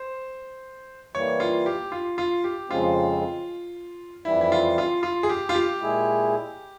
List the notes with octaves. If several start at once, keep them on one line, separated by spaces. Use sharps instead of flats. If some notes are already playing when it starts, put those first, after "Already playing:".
Already playing: C5
E3 G3 A#3 C#5
F4
G4
F4
F4
G4
F2 C#3 F3 G#3 C4 F4
F2 E3 G3 E4
E4
F4
F4
F4
G#4
G4
F4
G4
A#2 G#3 E4 G#4